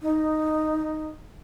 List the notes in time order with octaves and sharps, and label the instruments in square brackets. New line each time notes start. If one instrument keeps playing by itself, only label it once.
[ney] D#4